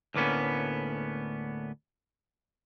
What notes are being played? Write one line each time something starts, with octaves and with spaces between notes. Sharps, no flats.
D2 A2 A#3 B3 C#4